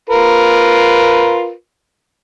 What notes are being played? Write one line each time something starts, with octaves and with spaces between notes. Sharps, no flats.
F4 A#4 B4